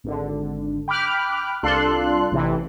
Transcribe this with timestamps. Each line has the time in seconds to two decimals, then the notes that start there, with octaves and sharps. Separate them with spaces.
0.04 G#1 D3
0.88 G5 B5 D6 F6 F#6
1.63 C2 D4 F4 A4 C6 F#6
2.32 A1 C3 E3